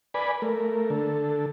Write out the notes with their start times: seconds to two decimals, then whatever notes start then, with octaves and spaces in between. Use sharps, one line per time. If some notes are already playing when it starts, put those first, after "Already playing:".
0.14 B4 D5 G#5 B5
0.42 A3 A#4
0.90 D3 A4